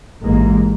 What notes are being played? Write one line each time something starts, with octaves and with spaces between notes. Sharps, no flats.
A1 G#2 G#3 A#3